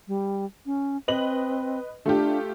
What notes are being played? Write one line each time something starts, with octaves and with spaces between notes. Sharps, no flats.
G3
C#4
C4 B4 D#5 F#7
A3 D4 F4 G4